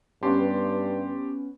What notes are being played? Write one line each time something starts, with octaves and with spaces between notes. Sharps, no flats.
G2 B3 C#4 G4 A5 C6